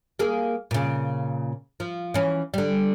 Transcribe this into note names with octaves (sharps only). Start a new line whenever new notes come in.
A#3 G#4
A#2 C#3
F3
E3 C#4
D3 G3